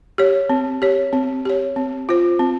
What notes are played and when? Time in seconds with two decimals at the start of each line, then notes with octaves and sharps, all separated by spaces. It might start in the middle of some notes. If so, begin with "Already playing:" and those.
0.18 G4 C#5
0.50 C4
0.82 G4 C#5
1.13 C4
1.45 G4 C#5
1.76 C4
2.09 F4 C5
2.39 C4